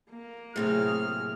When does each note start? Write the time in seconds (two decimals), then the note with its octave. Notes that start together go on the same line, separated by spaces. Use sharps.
0.11 A#3
0.56 A2 C3 F#3 G#4 F6